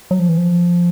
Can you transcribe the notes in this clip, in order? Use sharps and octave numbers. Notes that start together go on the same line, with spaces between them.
F#3
F3
E3
F3